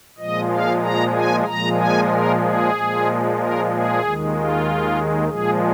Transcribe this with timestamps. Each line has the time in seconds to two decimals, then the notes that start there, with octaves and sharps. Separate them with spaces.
0.18 A#2 F3 G#3 D#5
0.50 F5
0.82 A#5
1.14 G#5
1.46 A#2 F3 G#3 A#5
1.78 G#5
2.09 A#4
2.41 G#4
2.74 A#2 F3 G#3
3.38 A#4
3.69 G#4
4.01 D#2 D#3 G#3
4.32 F4
5.28 A#2 F3 G#3 G#4